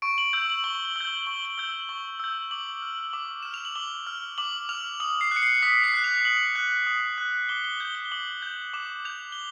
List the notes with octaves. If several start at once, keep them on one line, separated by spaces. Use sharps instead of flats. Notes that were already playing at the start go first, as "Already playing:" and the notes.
C#6 D7
F#7
E6 G6 F#7
F#7
C#6 G7
F#7
G7
E6 G6 G7
C#6 G7
G7
E6 G6
C#6
E6 G6
D6 F#7
F6
D6
F6 E7
F7
F#7
D6 G7
F6
D6 F#7
F6 F7
D#6 F#7
C7
F#6
C#7
C7
D#6 B6
C7
F#6
F7
D#6 F#7
F#6
D#6
F#6
D6 G7
G7
G6 G7
G7
D6 F#7
G6
D6 E7
G6 F7
G7